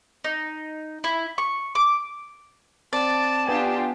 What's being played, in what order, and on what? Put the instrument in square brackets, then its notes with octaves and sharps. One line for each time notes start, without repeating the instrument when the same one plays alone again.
[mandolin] D#4
E4
C#6
D6
[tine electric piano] C4 [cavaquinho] D5 [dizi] A5
[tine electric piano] B3 G#5 [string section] D4 F4 G4